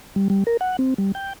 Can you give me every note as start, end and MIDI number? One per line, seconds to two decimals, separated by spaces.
0.16 0.28 55
0.30 0.44 55
0.47 0.57 70
0.61 0.77 78
0.79 0.94 60
0.98 1.12 55
1.15 1.33 79